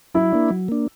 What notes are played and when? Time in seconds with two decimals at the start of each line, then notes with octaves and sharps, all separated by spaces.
0.14 F#3 E4
0.32 A#3 D4
0.50 F#3
0.68 A#3 D4